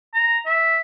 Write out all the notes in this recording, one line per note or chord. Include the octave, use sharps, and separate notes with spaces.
A#5
E5